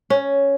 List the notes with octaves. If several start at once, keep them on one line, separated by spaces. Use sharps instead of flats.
C#4